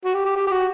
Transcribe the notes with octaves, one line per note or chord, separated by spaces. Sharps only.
F#4
G4
G4
G4
G4
F#4